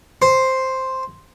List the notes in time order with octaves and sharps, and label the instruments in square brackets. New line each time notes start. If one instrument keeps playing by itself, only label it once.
[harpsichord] C5